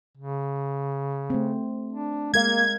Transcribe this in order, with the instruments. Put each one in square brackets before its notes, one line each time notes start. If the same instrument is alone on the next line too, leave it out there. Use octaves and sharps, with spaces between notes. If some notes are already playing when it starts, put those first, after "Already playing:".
[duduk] C#3
[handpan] A3 C4
[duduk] D4
[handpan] G#3 A#4 F5 [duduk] A#3 [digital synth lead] G#6